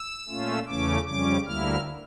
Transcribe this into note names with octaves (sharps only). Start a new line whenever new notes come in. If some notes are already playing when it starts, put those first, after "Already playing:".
Already playing: E6
A#2 A3 C#4 F4
E2 C#3 E3 A3 C#4 D6
F2 C#3 G3 C#4 D6
D2 D3 G3 A#3 E4 F6